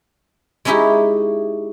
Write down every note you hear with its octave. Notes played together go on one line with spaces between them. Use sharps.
G#3 C#4 D#4 E4 G4